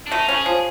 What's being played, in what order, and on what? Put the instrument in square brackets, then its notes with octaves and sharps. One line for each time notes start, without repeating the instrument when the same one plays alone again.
[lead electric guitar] D4
[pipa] A3 [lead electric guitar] D#4
[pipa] C#4
[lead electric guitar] G#4
[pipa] F3